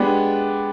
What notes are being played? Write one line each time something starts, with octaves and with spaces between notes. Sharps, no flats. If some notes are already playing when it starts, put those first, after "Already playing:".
Already playing: G#3 B3 D4 G4